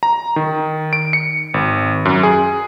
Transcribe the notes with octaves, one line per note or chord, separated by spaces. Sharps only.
A#5
D#3
D7
C#7
G#1
F#2
G#4